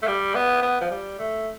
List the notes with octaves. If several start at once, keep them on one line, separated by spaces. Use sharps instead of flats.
A3
G3
B3
B3
F3
G3
A3